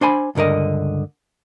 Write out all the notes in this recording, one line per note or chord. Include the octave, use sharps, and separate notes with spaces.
D4 C5 G#5 B5
C#2 G2 D3 A#4 D#5